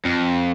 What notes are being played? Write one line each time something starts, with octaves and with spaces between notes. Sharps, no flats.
F2